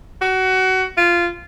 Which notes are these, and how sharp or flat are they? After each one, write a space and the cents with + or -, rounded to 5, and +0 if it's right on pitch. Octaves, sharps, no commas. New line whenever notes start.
F#4 +20
F4 -15